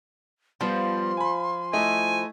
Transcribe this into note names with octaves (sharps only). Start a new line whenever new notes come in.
F3 G3 B3 C6
G#5 B5
A3 E4 D#5 G#5